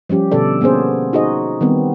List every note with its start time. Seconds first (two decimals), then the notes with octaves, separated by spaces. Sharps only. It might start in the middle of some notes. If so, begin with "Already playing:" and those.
0.09 F3 G3 C#4 G4
0.32 B2 D3 A4 D5
0.61 A#3 B3 C#4 G#4 C5
1.13 D#4 F#4 G#4 C5 D#5
1.61 D#3 G3 B3 C4